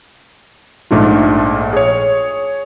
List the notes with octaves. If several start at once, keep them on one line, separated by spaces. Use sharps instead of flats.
A#1 G#2 A3 D4 F4
G#4 C#5